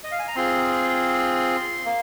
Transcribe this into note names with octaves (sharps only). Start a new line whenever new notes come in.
D#5
F5
G#5
A#5
C4 F4 G#4 C6
A#3